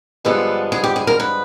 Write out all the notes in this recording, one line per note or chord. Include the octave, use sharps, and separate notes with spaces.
G2 D3 F3 G#3 B3 A4
G#4
G4
G#4
A#4
B4